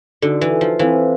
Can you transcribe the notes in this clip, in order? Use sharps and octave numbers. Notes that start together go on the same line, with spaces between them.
D3 D#4 F#4 A4
E3
F3
E3 C4 E4 A4 C5 F5